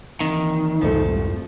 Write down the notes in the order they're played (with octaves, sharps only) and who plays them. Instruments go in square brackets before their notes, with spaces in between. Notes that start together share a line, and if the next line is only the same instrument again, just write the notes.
[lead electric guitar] D#3 [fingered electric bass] E3 A#3 C4
[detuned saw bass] C2 [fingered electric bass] F2 G#2 G#3 [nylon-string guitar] F3 A3